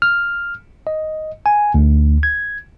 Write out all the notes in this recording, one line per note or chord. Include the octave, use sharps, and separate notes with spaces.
F6
D#5
G#5
D2
G#6